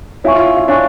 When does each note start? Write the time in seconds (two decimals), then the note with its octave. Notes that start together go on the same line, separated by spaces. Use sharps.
0.24 E4 C#5 F5 G#5 C#6
0.36 F4
0.57 F4
0.68 D4 C#5 F5 G#5 C#6